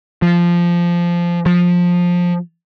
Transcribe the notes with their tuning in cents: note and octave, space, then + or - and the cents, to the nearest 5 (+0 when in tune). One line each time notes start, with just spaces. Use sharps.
F3 -10
F3 +15